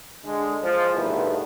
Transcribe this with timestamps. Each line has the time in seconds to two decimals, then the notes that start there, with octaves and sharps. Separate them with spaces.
0.25 D3 G#3
0.62 F3 G#3
0.93 E2 G2 B2 D#3 A3 B3